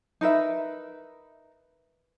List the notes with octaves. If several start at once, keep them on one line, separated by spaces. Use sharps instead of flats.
D#4 A#4 B4 E5